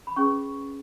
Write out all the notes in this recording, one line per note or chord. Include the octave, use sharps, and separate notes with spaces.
B5
C#4 G#4 B4 C#6